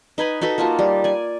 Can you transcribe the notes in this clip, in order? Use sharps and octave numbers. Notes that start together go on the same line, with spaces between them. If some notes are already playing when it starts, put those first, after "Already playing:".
D#4 B4 G#5 B5
D#4 F#4 A4 B4
A#3 F4 F#4 A5
G3
D5 G#5